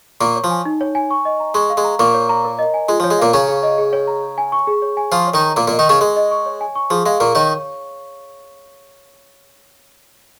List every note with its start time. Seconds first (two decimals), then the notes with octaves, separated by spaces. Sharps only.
0.21 A#2 A#3 C#6
0.36 C#5
0.44 F3
0.50 G#5
0.65 D#4
0.81 C#5
0.95 G#5
1.11 C#6
1.25 D#5
1.40 A#5
1.55 G#3 C#6
1.70 F5
1.77 G#3
1.84 A#5
1.99 A#2 A#3 C#6
2.14 C#5
2.29 A#5
2.45 A#4
2.59 D#5
2.74 G#5
2.88 G#3 F4
3.00 F3
3.04 C#5
3.11 G#3
3.19 A#2 A#3 F5
3.33 C#3 C#4 A#5
3.48 G#4
3.63 D#5
3.78 G#4
3.93 C#5
4.07 A#5
4.23 C#5
4.38 G#5
4.52 C#6
4.67 G#4
4.82 C#5
4.97 G#5
5.12 F3 F4 C#6
5.27 C#5
5.34 D#3 D#4
5.42 A#5
5.56 A#2 A#3 A#4
5.68 A#2 A#3
5.71 D#5
5.79 D#3 D#4
5.86 C#3 C#4 C#6
6.01 G#3 G#4
6.16 D#5
6.31 C#6
6.46 C#5
6.61 G#5
6.75 C#6
6.90 F3 G#4
7.05 G#3 F5
7.20 A#2 A#3 C#6
7.35 D#3 D#4 C#5